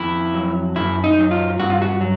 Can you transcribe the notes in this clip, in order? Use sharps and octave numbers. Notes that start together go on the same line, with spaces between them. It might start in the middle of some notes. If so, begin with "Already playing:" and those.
Already playing: F2 E4
F#3
F#2 E4
D#4
F#3
F4
G2 F#4
F4
F#4
F#3